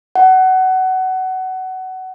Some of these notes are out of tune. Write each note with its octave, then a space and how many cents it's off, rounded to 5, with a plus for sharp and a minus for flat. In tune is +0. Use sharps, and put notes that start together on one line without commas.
F#5 +20